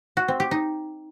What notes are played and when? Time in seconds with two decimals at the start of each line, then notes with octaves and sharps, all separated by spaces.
0.17 F#4
0.28 C4
0.40 G4
0.51 D#4